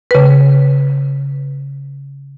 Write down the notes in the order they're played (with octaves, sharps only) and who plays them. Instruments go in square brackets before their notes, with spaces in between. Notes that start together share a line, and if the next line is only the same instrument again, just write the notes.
[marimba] C#3 B4